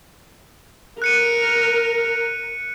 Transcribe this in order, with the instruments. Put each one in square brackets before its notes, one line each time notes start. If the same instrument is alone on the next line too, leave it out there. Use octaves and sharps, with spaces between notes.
[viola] A#4 [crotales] F#6 C#7 D#7